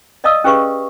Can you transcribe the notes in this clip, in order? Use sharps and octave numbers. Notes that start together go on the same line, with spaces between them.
D5 D#5 F5 A5 D#6 E6
C#4 G4 G#4 B4 F5 C#6